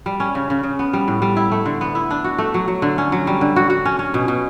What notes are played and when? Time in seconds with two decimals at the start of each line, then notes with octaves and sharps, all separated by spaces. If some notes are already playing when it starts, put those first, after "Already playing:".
0.06 G3
0.20 C#4
0.35 C#3
0.50 C#3
0.63 C#3
0.79 B3
0.93 G3
1.08 A2
1.22 G3
1.36 E4
1.52 A3
1.66 D3
1.81 B3
1.95 E4
2.10 D4
2.24 F#4
2.38 A3
2.54 F#3
2.68 F#3
2.82 D3
2.98 C#4
3.12 F#3
3.27 G3
3.41 D3
3.56 F#4
3.70 F#4
3.85 C#4
3.99 C#4
4.14 B2
4.28 B2